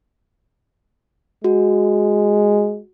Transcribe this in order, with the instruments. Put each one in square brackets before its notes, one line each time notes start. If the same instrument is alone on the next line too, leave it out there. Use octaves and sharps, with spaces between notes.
[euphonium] G#3 [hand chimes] F#4